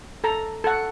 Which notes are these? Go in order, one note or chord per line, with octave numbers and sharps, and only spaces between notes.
A4 A#5
A4 F#5